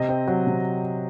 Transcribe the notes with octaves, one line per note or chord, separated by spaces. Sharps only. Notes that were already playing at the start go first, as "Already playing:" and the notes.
Already playing: C3 D#5
C4
F#3
C3